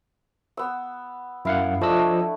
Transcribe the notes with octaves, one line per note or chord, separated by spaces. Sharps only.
B3 E6
F#2 E4 F5 F#5
F3 A3 D4 D#5 E6